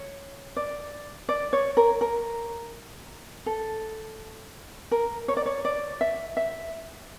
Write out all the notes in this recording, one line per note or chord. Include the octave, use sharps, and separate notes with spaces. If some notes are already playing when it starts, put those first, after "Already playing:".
Already playing: C#5
D5
D5
C#5
A#4
A#4
A4
A#4
C#5
D5
C#5
D5
E5
E5